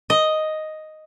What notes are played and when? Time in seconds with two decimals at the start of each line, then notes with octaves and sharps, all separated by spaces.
0.10 D#5